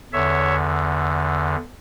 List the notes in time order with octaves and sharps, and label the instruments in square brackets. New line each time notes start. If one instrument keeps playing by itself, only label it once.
[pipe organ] E2 D3 C#5 E5